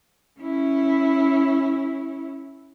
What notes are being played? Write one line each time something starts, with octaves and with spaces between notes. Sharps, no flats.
C#4 E4